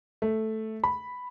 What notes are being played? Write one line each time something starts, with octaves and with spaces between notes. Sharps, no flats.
A3
B5